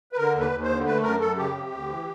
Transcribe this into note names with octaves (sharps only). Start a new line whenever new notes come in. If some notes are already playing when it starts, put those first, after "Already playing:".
B4
D3 A#4
D#2
B4
D#2
C5
D3
A3 B4
F#2 A#4
F#2 A4
C#3 G4
C3
D2
E3